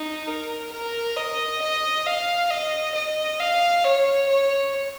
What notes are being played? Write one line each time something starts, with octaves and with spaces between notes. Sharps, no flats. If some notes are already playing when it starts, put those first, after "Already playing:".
Already playing: D#4
A#4
A#4
D#5
D#5
F5
D#5
D#5
F5
C#5
C#5